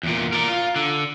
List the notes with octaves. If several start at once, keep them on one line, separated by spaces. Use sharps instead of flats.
E2 A#2
A#4 D5
F4
D3